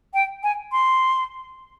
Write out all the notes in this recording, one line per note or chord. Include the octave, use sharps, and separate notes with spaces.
G5
G#5
C6